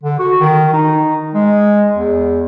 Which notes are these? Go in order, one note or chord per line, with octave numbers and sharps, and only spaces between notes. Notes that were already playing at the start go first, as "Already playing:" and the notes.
D3
F#4
D#3
D#4
G#3
E2